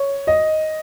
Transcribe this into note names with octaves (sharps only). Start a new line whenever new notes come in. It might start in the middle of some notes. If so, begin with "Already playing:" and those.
Already playing: C#5
D#5